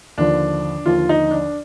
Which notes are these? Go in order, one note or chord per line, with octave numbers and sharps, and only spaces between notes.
D#2 D3 F3 D4
D#2 D3 F3 F4
D#4
D4